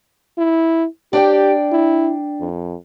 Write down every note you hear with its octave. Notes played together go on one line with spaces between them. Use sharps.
E4
D4 G4 D5 G5
E4
F2